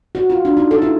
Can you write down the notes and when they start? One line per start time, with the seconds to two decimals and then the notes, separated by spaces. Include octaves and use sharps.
0.15 F#4
0.30 F4
0.45 D4
0.57 D#4
0.71 A4
0.82 E4